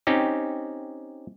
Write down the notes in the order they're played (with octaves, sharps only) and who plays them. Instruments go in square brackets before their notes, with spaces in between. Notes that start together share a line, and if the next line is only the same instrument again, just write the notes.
[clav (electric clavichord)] C4 C#4 D#4 G4